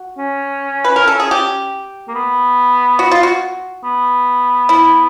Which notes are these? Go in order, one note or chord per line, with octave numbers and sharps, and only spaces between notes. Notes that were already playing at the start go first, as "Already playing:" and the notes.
Already playing: F#4
C#4
B4
A#4
A4
G#4
G4
A#3
B3
F#4
F4
F#4
B3
E4